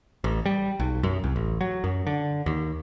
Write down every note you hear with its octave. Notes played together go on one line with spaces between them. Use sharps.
A1
G3
B1
F#2
C2
A1
F#3
F#2
D3
D#2